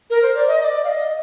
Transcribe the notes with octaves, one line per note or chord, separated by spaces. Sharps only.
A#4
C5
D5
D#5
D#5
D5
F5
D#5